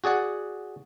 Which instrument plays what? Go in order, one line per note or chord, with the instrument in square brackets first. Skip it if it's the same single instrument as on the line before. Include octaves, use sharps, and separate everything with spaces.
[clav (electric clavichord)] F#4 G#4 D5 F#5